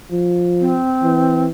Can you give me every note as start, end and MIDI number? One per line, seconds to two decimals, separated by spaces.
0.11 0.79 53
0.61 1.44 60
1.03 1.50 52